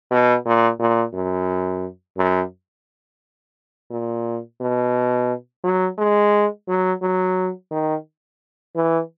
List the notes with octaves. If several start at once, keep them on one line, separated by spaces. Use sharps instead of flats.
B2
A#2
A#2
F#2
F#2
A#2
B2
F#3
G#3
F#3
F#3
D#3
E3